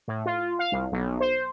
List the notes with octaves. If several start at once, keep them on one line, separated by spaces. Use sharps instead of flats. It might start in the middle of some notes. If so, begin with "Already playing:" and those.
A2
F4
F5
C2
B1
C5